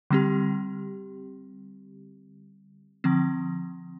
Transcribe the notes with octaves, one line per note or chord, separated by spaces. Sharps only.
D3 G3 C4 G4
D3 F3 C4